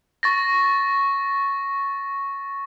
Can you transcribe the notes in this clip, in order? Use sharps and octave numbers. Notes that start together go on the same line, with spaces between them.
C#6 A6 A#6